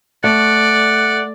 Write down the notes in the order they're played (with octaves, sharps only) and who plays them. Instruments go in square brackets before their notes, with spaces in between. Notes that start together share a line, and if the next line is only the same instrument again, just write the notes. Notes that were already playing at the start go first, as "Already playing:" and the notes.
[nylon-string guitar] A3 [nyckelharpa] D5 [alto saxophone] F#5